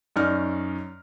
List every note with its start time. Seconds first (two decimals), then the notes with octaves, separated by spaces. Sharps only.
0.16 F#2 C#4 D#4 D5 F6